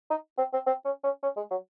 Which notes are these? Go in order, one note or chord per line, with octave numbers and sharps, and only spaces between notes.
D#4
C4
C4
C4
C#4
C#4
C#4
G#3
F#3